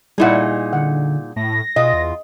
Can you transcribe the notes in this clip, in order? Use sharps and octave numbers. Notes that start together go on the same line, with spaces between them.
A#2 G3 D#4 E4 G#4 F#5
D3 F#5
A2 A#6
B2 F4 D#5
E2